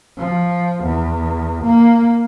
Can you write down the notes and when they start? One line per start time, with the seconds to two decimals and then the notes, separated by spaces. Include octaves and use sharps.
0.17 F3
0.84 E2
1.65 A#3